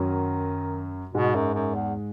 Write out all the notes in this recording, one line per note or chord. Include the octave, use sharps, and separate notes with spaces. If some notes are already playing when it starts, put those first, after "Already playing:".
Already playing: F#2 D#3 F#3
G#2 B2 G#3
F#2
F#2
E2